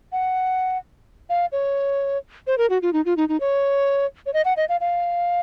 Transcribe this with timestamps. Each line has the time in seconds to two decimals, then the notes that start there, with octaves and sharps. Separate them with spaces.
0.12 F#5
1.30 F5
1.52 C#5
2.47 C5
2.58 A#4
2.70 F#4
2.82 F4
2.93 D#4
3.06 F4
3.17 D#4
3.29 D#4
3.40 C#5
4.26 C#5
4.33 D#5
4.45 F#5
4.57 D#5
4.69 F5
4.81 F5